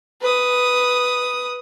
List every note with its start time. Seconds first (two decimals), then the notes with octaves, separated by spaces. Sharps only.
0.22 B4 D#6